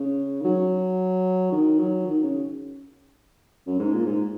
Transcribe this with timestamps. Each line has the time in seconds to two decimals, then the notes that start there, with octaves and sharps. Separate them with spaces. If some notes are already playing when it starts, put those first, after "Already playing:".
Already playing: C#3
0.41 D#3
0.45 F#3
1.52 D#3
1.78 F#3
2.05 D#3
2.23 C#3
3.66 F#2
3.79 G#2
3.93 A#2
4.06 G#2